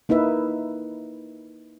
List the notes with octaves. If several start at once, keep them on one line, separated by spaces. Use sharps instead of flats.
A#3 D#4 E4 B4 E5